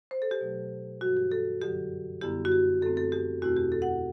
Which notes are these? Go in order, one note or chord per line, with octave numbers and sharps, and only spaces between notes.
C5
A4
G4
B2 F#3 A3
G2 E3 G3 F#4
G4
A4
F#2 D3 F#3 G4
F#2 D3 G3 B3 E4 G4
F#4
G4
F#2 D3 A3 C4 A4
A4
G4
E2 B2 A3 C4 E4 F#4
G4
A4
F#5